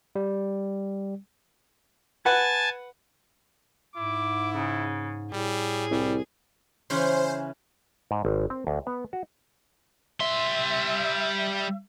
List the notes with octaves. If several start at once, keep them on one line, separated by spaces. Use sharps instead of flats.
G3
B4 F#5 G#5 A5 A6
G#2 E4 D6
C#3
A2 G3 G#4
C2 G3
C#3 E3 C#4 C5
G#2
G#1
C4
D2
B3
F#4
G3 E5 C6